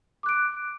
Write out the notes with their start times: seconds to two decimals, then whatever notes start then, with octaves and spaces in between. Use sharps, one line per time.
0.23 D6
0.26 F#6
0.29 D7